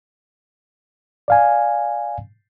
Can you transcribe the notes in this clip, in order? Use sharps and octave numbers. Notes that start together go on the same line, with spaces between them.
D5 F5 G#5